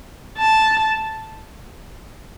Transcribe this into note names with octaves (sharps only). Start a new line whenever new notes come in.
A5